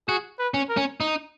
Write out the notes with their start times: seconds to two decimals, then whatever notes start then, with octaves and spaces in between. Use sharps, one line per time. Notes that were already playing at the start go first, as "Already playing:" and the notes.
0.08 F#4 G#4
0.39 B4
0.54 C#4
0.70 A#4
0.77 C#4
1.00 D#4